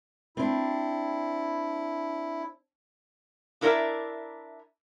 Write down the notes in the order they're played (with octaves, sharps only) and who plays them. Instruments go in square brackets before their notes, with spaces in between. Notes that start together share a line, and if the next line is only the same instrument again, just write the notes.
[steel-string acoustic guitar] C4 D4 [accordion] E4
[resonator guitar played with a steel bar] D4 E4 A#4 C#5 D5 E5